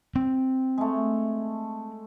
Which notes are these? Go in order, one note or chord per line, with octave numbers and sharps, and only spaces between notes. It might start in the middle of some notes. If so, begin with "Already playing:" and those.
C4
G#3 A3